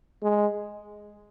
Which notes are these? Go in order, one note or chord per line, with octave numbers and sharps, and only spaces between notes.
G#3